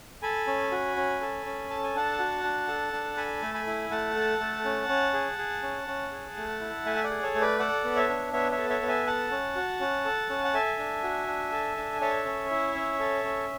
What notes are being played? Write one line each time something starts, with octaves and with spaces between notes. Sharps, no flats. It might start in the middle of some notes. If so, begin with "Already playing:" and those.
A4 G#5 B5
C#4
F#4
C#4
A4
C#4
A4 A5
G#5
D4 F#5 A5
F#4
D4
A4
D4
A4 G#5 B5
A3
G#5 B5
E4
A3 F#5 A5
A4
A3
C#4
C#4
G#4
G#4
C#4
C#4
G#4
A3
E4
A3 E5 G#5
E5
D5 F#5
G#4
A4 C#5
A3
B4 D5
A4 D5 F#5
B3
C#5 E5
D4
B3 C#5 E5
C#5 E5
A4
C#5 E5
B3
E5 G#5
A4 F#5 A5
C#4
F#4
C#4
A4
C#4
F#5
A4 E5 G#5
D4
F#4
D4
A4
D4
A4 C#5 E5
C#4
E4
C#4
A4
C#4